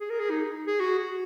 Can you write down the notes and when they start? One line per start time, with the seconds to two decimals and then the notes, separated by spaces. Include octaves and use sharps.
0.01 G#4
0.10 A#4
0.20 G#4
0.31 D#4
0.67 G#4
0.80 F#4
0.99 F#4